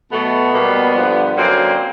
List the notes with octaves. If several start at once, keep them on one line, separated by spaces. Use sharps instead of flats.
B2 F#3 A3 B3
B2 G3 A#3
G2 D3 F3
F#2 D3 F#3 A#3 C4